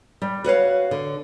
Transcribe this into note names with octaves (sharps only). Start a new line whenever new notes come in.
G3
F#4 B4 C#5 F5
D3